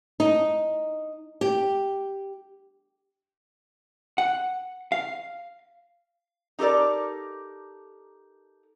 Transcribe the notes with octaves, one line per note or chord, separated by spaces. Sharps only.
D#4
G4
F#5
F5
D#4 G4 A4 A#4 D5